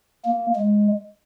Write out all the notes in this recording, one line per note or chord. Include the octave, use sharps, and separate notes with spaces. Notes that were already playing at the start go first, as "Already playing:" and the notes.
A#3
G#3